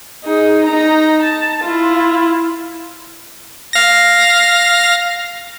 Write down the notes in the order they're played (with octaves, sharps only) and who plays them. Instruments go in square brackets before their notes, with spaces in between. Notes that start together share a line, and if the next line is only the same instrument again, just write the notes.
[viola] D#4 G#4
D#4 A#5
A5
E4 F4
[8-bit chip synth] F5 A#6